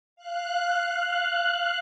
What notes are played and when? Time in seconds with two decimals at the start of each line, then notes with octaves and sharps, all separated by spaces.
0.16 F5 F#6